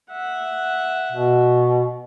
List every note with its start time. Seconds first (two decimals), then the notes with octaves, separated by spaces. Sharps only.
0.11 E5 F#5
1.12 B2